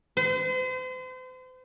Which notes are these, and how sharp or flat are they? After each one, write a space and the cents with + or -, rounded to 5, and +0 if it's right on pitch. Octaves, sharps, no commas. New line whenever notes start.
C5 -40